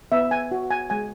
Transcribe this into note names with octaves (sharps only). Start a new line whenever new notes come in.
B3 E5
G#5
F#4
G#5
G#3 G#5